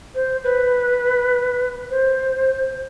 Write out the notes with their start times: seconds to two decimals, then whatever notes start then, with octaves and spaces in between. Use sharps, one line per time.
0.15 C5
0.44 B4
1.90 C5